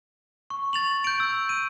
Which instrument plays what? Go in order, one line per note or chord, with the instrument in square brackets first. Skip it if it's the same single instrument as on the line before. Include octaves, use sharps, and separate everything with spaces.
[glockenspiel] C#6
A6 F7 F#7
G6 D7
E6
D#7